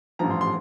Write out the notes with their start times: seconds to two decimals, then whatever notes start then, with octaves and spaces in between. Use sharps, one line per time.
0.19 A1 G2 F3 A#5
0.30 C6
0.41 C6